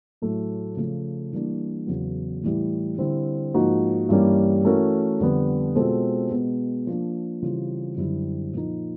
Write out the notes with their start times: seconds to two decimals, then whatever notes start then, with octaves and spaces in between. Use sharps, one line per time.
0.22 A2 F#3 A3
0.76 C#3 F3 A3
1.33 E3 G3 A#3 D4
1.87 E2 C#3 F#3 B3
2.43 A2 E3 G3
2.98 D3 G3 C4 E4
3.54 G#2 F3 A#3 D#4 F#4
4.09 G2 E3 G3 A#3 C#4
4.64 E3 A3 C#4 F#4 A#4
5.20 F2 D3 G3 B3
5.75 B2 G#3 C4 F4 A4
6.31 B2 G#3 B3
6.87 F3 A#3 D4
7.42 C#3 E3 G3 C4 F4
7.97 F#2 D3 G3 C4 E4
8.53 A#2 F3 A#3 D#4